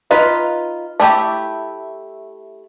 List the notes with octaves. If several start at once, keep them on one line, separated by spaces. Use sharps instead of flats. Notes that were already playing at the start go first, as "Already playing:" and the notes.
D#4 F4 B4
A3 E4 G4